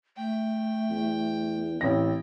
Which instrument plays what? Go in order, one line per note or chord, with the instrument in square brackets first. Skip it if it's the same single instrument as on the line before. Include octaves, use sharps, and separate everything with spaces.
[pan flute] A3 [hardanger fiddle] G5
[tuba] E2
[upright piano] A1 A#6 [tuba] E3 [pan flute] C4